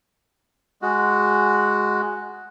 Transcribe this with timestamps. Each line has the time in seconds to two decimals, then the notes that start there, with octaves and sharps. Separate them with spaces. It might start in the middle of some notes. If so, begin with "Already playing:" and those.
0.82 G#3 F#4